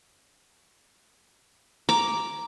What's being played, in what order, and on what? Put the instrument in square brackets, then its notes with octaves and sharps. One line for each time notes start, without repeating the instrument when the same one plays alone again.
[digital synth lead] A#5 [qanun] D6